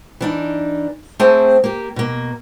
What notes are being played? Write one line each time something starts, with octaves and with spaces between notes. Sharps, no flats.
E3 D4 D#4
A3 C4 G#4 C5 G5 A5
A#3 G4
B2 A#3